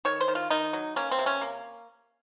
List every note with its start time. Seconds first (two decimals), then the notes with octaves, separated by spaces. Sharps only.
0.05 D#3 C#5
0.21 C5
0.28 D#3
0.35 F4
0.50 D#3 D#4
0.73 F#3
0.96 A#3 C#4
1.11 C4
1.19 C3
1.26 C#4
1.41 A#3